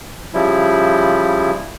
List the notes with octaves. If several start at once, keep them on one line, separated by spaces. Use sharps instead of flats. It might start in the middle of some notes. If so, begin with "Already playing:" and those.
C#3 F3 G3 E4